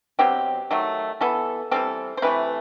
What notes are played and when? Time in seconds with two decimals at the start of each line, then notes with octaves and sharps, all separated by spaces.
0.19 B2 F#3 C4 G4
0.71 D#3 F#3 A3
1.21 E3 B3 A4
1.71 E3 G3 C4 A4
2.17 C5
2.22 C3 E3 A3 B4